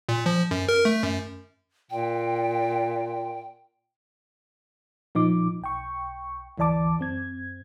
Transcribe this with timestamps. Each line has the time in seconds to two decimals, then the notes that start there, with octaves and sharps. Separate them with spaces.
0.09 A#2
0.26 F3
0.51 F#2
0.69 A#4
0.85 A3
1.03 F#2
1.91 A#2 G5
5.15 A#2 F3 D#4 D6
5.62 B1 G5 C#6
6.58 G#1 D2 E3 D5 A5 D6
6.99 F#2 C4 G#6